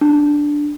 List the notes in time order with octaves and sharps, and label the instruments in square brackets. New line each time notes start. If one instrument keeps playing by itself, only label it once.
[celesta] D4